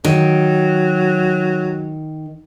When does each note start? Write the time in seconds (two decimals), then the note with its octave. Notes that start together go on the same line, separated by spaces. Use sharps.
0.04 D#3 F#3